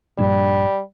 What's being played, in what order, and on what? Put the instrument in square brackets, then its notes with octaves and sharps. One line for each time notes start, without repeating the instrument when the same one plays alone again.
[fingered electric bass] A#1 G2 [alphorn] G3